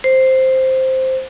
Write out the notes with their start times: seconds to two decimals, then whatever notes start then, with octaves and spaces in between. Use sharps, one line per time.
0.04 C5